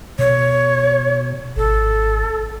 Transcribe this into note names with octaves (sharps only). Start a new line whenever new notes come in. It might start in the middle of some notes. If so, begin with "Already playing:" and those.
B2 C#5
G#1 A4